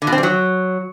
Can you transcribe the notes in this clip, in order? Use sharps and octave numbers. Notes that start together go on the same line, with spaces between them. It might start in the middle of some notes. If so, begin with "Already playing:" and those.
D3
B2
C4
G3
F#3